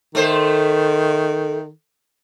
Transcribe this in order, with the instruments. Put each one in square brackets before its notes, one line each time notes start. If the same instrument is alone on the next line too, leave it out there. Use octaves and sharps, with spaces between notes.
[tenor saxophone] D#3 [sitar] A3 C5